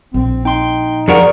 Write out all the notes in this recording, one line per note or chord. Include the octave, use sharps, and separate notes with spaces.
A#1 C4
D#4 G5 C6
F2 F#4 G#4 A#4 D5 C#6